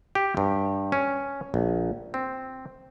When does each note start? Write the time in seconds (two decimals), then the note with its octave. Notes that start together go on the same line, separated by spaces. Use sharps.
0.15 G4
0.37 G2
0.92 C#4
1.54 A#1
2.14 C4